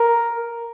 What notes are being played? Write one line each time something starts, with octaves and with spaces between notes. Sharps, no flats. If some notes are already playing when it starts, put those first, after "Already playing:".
Already playing: A#4